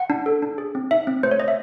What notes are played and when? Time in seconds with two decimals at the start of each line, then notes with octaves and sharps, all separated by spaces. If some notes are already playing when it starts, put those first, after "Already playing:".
Already playing: F#5
0.10 D4
0.26 A4
0.42 D4
0.58 G#4
0.75 C4
0.91 D#4 E5
1.07 C4
1.23 A3 C5
1.31 C#5
1.40 C4 D#5
1.48 E5